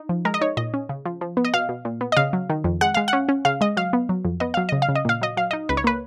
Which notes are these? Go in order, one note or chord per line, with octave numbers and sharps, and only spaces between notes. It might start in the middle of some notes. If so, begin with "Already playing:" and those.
Already playing: D#4
F3
G#3 A#4
D#5
D#4 C#5
A#2 D#5
C#4
C#3
F3
F3
B3
D#5
B2 F5
B2
A#2
B3
D#5
C#3 F5
F#3
D#3
F2
G#3 F#5
G#3 F5
F#5
C#4
C#4
C#3 F5
G#3 D#5
F#3 F5
B3
F#3
F2
B3 D#5
F#3 F5
C#3 D#5
F5
C#3
D#5
A#2 F5
F#3 D#5
F#3 F5
D#4 D#5
C#2 B4
C#5
A#3 B4